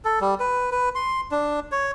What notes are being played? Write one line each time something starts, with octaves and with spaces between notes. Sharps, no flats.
A4
G3
B4
B4
C6
D4
C#5